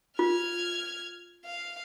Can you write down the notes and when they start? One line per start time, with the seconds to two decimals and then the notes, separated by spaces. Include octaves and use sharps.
0.19 F4 F6 G#6
1.45 F5